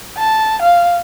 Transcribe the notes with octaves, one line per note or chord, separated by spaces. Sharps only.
A5
F5